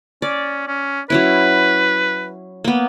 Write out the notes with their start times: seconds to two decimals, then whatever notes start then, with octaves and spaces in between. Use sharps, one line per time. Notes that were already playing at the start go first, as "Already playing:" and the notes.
0.22 C#4 D5
0.68 C#4
1.10 F#3 C#4 E4 B4
2.64 A#3 B3